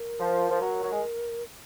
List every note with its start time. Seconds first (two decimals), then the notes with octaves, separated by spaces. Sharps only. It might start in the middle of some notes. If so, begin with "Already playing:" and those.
Already playing: A#4
0.20 F3
0.50 F3
0.61 F#3
0.83 F#3
0.91 G#3